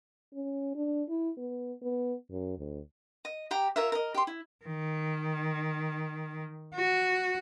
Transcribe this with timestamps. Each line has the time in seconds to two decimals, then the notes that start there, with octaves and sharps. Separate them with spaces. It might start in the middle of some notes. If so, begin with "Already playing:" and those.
0.34 C#4
0.75 D4
1.09 E4
1.37 B3
1.82 B3
2.31 F#2
2.59 D2
3.25 D#5
3.51 G4 G5 A#5
3.76 F4 A#4 C#5 E5
3.92 A#4 D#5
4.14 G4 C6
4.27 E4
4.65 D#3
6.75 F#4